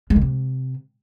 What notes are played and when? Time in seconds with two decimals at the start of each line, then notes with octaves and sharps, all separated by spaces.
0.10 G#3
0.16 D#3
0.21 C3